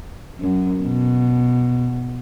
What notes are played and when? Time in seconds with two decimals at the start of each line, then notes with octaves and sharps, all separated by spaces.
0.41 F#2
0.83 B2